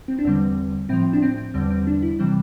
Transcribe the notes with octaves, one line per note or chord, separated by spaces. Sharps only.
C4
D4
E2 D3 G3 C4
A2 F3 C4
D4
C4
C4
E2 D3 G3 C4
C4
D4
E4
C3 E3 G3 C4